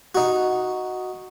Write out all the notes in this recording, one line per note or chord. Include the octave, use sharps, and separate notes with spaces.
D#4 F#4